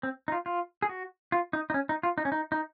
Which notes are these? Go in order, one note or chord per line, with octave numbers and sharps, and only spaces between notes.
C4
D#4
F4
F4
G#4
F#4
F4
D#4
D#4
C#4
D#4
F4
D#4
C#4
D#4
D#4